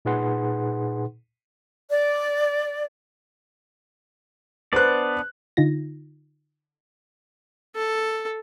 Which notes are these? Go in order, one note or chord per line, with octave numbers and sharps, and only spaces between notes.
A#2 D#4 G#4 B4 F#5 C6
D5
B3 D4 B4 C5 D5 F#6
D3 D#4 F4 A#6
A4